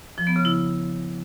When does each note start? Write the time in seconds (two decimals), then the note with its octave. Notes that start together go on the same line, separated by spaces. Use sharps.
0.18 F3
0.27 B3
0.36 C#3
0.45 E4